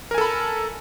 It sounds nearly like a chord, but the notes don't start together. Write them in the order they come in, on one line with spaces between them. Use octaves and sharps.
A#4 G#5 A4 B5